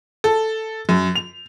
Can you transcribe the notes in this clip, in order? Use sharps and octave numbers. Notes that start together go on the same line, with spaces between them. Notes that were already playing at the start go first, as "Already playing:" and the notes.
A4
F#2
F7